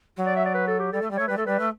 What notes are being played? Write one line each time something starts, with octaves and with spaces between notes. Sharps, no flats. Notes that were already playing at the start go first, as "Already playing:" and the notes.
F#3
D5
E5
D5
B4
A4
G4
G3 A4
A3
G3
A3 C#5
G3 B4
A3 A4
G3 B4
A3